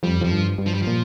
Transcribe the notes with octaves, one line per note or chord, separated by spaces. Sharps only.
F2 G3
F2 F3
G2
G2
F3
G3
A#2 F3